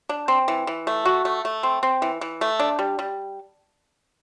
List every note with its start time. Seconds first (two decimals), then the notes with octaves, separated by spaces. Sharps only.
0.09 D4
0.28 C4
0.48 E3
0.67 E3
0.87 A3
1.05 F#4
1.25 A3
1.45 A3
1.63 C4
1.83 C4
2.02 E3
2.21 E3
2.41 A3
2.59 D4
2.79 G3
2.99 G3